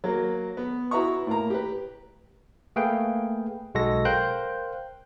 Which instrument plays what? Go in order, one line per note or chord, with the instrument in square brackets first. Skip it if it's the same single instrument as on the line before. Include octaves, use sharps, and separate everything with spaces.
[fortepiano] F#3 A#3
B3
E4 F#4 B4 E5 A#5 C#6
A2 A#3 A#5
G4 B4
[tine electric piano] A3 A#3 G#4 B4 F5 G5
B1 G#3 F#4 A4 A#6
A#4 C5 F5 G5 F#6 G6